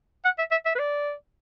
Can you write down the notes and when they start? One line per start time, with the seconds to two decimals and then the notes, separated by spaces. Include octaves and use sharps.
0.25 F#5
0.39 E5
0.51 E5
0.66 E5
0.75 B4
0.79 D5